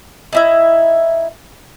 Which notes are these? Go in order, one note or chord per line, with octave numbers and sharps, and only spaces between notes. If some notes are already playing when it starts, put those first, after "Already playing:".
D#4 E4 E5